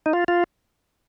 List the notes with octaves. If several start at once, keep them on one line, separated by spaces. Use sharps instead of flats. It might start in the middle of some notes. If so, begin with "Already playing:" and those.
D#4
F4
F4